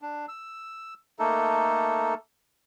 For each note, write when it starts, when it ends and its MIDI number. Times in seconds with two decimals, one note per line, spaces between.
0.02 0.26 62
0.28 0.94 88
1.19 2.14 57
1.19 2.14 58
1.19 2.14 63
1.19 2.14 69